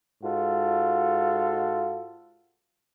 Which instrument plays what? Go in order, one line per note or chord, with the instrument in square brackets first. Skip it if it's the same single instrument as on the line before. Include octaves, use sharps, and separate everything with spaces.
[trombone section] G#2 F4 F#4 A4